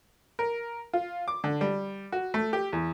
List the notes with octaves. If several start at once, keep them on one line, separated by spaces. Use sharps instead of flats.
A#4
F4
D6
D3
G3
F#4
A3
G4
E2